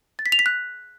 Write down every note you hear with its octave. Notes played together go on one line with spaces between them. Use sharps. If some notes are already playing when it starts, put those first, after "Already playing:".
A6
B6
F7
B6
F#6